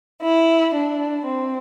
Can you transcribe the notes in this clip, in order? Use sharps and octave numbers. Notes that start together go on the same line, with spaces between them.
E4
D4
C4